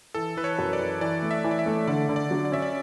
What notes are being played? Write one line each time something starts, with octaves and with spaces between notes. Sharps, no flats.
E3 A4
E3 B4
C#5
F#2
D5
E3
E3 D5
A3
E5
E3
D5
E5
A3
D3 D5
D3
D5
F#3
D5
C#4 E5
D5